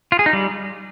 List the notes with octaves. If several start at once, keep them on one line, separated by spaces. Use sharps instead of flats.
F4
G#4
D#4
G3